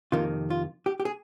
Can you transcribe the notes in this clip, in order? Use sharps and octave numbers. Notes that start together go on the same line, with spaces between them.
F2 C3 D#3 A#3 F4
F4
G4
G4
G#4